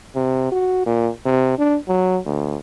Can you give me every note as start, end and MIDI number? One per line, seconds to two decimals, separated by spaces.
0.15 0.46 48
0.51 0.82 66
0.86 1.10 46
1.25 1.53 48
1.58 1.77 62
1.88 2.19 54
2.26 2.56 38